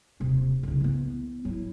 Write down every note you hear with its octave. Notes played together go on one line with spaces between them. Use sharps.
D#1 C3
C2 C#3
E3 B3
F#3 E4